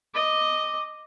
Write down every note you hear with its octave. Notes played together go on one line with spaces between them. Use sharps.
D#5 D6